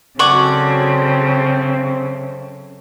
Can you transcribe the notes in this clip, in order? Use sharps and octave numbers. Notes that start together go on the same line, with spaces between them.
F#2 C#3 C4 A4 D5 F#5 G#5 C#6